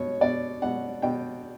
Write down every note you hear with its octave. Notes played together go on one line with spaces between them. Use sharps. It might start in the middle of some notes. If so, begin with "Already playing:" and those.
Already playing: B2 C#5
B2 D5
B2 F#5
B2 G5